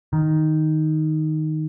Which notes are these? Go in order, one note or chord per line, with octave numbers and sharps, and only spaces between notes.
D#3